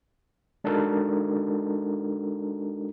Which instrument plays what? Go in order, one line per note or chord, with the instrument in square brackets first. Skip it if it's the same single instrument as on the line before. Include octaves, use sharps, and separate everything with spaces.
[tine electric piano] G#3 D4 D#4 F#4 A4 A#4